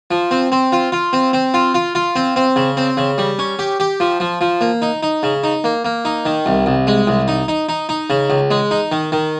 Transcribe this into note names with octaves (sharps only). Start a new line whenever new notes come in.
F3
C4
C4
F4
F4
C4
C4
F4
F4
F4
C4
C4
C#3
C4
C#3
G3
C#4
G4
G4
F3
F3
F3
A#3
D#4
D#4
C#3
D#4
A#3
A#3
D#4
D#3
C2
C2
G#3
C2
D#4
D#4
D#4
D#4
C#3
C#2
G#3
D#4
D#3
D#3